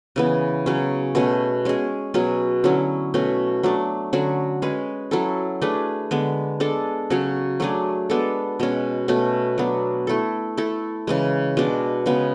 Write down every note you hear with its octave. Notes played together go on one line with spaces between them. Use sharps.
C#3 E3 B3
C#3 F#3 C#4 G#4
B2 A3 C#4 G#4
G#3 C#4 G#4
B2 F#3 C#4 G#4
D3 F#3 C#4 E4
B2 A3 C#4
F#3 A3 D4
D3 F#3 C#4 F#4
G#3 C#4 G#4 B4
F#3 C#4 E4 A4
A3 D4 G#4 B4
D3 G#3 B3
G#3 D4 A4
C#3 F#3 C#4 F#4
F#3 A3 D4 G#4
G#3 B3 D4 A4
B2 G#3 C#4
B2 A3 C#4
F#3 B3 D4
A3 E4 A4
A3 E4 A4
C#3 E3 G#3
B2 G#3 D4
C#3 G#3 B3